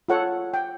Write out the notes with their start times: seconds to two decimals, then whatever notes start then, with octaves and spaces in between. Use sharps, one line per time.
0.08 F4 A4 C#5 F#5
0.54 G5